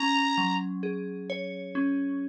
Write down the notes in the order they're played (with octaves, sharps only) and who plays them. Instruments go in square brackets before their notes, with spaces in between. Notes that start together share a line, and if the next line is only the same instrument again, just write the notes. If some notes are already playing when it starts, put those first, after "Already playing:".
Already playing: [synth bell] C#4 [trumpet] A#5
[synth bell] F#3
G#4
C#5
C#4